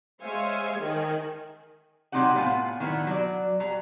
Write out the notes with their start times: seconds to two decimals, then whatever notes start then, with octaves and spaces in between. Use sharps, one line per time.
0.23 G#3 C5 C#5 E5 F5 G#5
0.79 D#3 G#5
2.12 C3 F#3 C4 D#4 G4 F#5
2.35 A2 B3 F4 F5 F#5 G#5
2.80 D#3 F#3 G3 B3 E4 B4
3.07 F#3 D5
3.60 F#3 G3 A#5